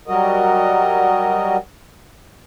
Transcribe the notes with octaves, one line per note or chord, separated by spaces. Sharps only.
F#3 G3 F#4 A#4 D#5